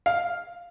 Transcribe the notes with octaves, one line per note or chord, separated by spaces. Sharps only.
F5